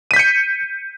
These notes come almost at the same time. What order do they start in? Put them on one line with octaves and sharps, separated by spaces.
D#7 B6 G6 C#7